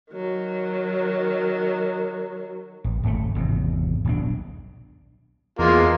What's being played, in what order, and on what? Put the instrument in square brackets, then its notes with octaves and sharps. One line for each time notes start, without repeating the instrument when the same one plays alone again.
[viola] D#3 F#3
[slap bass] A1
D1 G#1 G#3 A3
G#1 E2 C3
D#1 B1 D4
[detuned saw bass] E2 [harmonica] G#3 A#3 [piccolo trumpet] F4